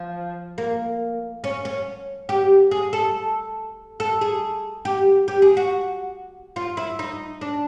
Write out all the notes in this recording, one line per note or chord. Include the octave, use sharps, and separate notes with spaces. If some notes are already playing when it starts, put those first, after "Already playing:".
Already playing: F3
A#3
C#4
C#4
G4
G#4
A4
A4
G#4
G4
G4
G#4
F#4
F4
E4
D#4
D4